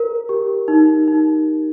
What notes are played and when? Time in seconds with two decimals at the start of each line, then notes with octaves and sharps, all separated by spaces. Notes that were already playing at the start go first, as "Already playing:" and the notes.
Already playing: A#4
0.29 G4
0.68 D#4
1.08 D#4